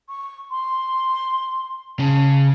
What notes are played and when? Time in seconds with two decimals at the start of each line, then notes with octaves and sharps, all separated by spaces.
0.09 C#6
0.50 C6
2.00 C#3 A5